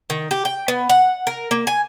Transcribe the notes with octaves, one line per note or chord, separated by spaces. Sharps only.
D#3
G4
G5
B3
F#5
A#4
A#3
G#5